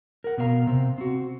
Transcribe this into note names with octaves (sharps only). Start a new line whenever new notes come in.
A#4 F#5
B2 B3 A#4 F5 A#5
C3 C4
C4 F#4